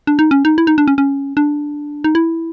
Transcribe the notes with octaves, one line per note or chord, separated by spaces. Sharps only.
D4
D#4
C#4
D#4
E4
D#4
D4
C#4
C#4
D4
D#4
E4